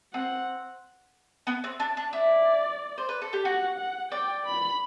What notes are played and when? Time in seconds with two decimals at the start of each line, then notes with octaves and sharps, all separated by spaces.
0.14 C4 F#5
1.47 B3
1.64 C4
1.80 D4
1.97 D4
2.13 E4 D5
2.98 C5
3.09 B4
3.22 A4
3.33 G4
3.45 F#4 F#5
3.78 F#5
4.12 D5 G5
4.46 B5